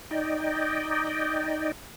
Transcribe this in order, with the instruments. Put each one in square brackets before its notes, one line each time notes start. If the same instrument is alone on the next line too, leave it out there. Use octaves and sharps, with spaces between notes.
[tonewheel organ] D#4 D5 D#5 G5